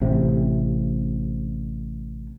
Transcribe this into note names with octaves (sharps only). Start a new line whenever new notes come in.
A1 C3